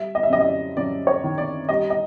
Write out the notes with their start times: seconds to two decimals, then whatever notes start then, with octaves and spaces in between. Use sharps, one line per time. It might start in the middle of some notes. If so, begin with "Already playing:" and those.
Already playing: G3 E5
0.15 D#5
0.23 E5
0.30 F#2 D#5
0.41 D#5
0.46 D5
0.77 F#2 D5
1.07 C#5
1.24 D#3
1.38 D5
1.69 G3 D#5
1.90 D#5